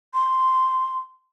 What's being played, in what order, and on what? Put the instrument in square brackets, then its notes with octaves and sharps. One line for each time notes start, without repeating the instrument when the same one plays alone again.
[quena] C6